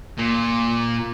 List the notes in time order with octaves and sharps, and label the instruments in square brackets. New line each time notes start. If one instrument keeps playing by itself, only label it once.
[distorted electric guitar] A#2